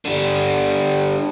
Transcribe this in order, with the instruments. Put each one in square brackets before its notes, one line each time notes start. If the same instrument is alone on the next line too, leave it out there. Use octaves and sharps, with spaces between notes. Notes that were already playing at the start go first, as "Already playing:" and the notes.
[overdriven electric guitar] D3 G3